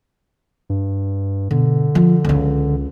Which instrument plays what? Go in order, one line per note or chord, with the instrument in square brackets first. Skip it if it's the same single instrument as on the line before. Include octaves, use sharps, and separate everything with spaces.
[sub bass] G2
[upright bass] B2 [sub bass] D3
[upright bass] F3
C#2 C#4